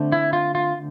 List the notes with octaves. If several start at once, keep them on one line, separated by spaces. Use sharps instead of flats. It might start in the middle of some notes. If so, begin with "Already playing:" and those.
Already playing: D3 A3 C4
E4
F4
F4